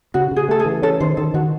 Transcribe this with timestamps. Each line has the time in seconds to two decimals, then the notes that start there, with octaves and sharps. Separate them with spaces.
0.14 C#3 F#4
0.31 C#3
0.36 G#4
0.49 A3 A4
0.59 G#4
0.65 E3
0.82 C#4 A4
1.00 D#3 C5
1.17 D#3 A4
1.34 D#3 F#4